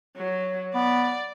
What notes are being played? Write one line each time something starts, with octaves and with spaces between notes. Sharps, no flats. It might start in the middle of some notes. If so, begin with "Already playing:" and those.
F#3
B3 D5